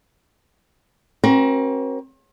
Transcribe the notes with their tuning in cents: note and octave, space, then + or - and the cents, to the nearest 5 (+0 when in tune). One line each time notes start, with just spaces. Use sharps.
C4 +45 F#4 +30 A#4 +35